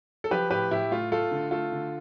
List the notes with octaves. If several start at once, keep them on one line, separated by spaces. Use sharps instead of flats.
A4
F3 G4 B4
A2 G4 B4
A2 E4 G4
A3 F4
A3 F4 A4
D3
A3 F4 A4
D3